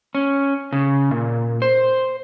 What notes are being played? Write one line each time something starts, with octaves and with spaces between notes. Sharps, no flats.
C#4
C#3
A#2
C5